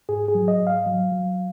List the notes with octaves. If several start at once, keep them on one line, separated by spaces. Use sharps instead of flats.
G#2 G#4
G#4
F#3
D#5
G#2
F5
F#3
F#3